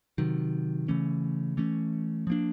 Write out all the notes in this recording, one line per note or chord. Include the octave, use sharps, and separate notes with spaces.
C3 D#3 F#3
C#3 E3 A3 C#4
E3 A3 C#4
F3 A#3 D4